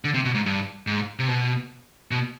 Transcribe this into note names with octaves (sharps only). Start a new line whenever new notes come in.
D3
C3
B2
G#2
G2
G#2
C3
B2
B2